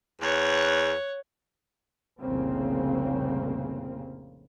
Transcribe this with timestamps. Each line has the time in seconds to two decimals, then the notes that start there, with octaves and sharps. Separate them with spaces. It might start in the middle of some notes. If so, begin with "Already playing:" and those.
0.21 E2 C#5 F#5
2.20 F1 C2 A#2 C#3 A#3 C4